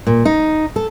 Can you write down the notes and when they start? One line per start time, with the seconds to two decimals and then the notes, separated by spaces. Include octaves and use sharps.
0.07 A#2
0.25 D#4
0.76 A4